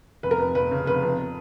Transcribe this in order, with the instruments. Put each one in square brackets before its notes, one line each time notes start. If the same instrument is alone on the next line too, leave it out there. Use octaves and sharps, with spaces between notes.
[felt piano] F1 [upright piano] B4
[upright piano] A#4
[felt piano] F2 [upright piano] B4
[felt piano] F1 [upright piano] B4
[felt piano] C#3
[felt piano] F1 [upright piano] B4
[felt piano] F2